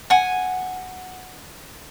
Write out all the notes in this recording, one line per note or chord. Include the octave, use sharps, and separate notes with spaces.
F#5 G#5